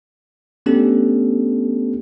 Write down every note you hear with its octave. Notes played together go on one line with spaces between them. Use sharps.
A3 B3 C#4 D4 G4 A4